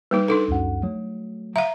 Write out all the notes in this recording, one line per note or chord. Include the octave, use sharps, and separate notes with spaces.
G3 A#3 D#4 B4
D4 D#4 A4
C#2 F#2 F#5
F#3 A3
E5 F5 A#5